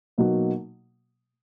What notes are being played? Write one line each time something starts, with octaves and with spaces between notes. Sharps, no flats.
B2 F#3 A#3 D#4 F#4